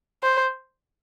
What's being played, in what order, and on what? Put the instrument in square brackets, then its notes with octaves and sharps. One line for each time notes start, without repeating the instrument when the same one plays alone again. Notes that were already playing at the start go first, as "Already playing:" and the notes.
[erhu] C5